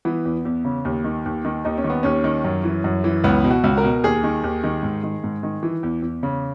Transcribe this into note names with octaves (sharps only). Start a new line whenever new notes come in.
E3 B3
E2
E2
C#3
D#2
D#3
D#2
D#3
D#2 D#4
C#4
D#3
B3
D#2 C#4
D#3
F#2
E3
F#2
E3
C#2 B3
B2
F#4
C#2
A#4
B2
D#2 G#4
D#3
D#2
D#3
G#2
D#3
G#2
D#3
E3
E2
E2
C#3